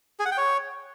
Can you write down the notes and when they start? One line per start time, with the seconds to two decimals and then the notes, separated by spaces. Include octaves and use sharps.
0.20 G#4
0.26 F#5
0.32 G5
0.38 C#5